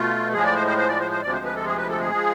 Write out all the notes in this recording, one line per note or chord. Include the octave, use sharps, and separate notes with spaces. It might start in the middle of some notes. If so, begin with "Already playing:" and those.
Already playing: B2 A3 F4
A2 F3 G#3 G#4
D5
C5
C5
C5
D5
C5
C5
D2 C3 F3 G#3 D5
C5
B4
A4
G#4
B4
A4
G#4
F3 G#3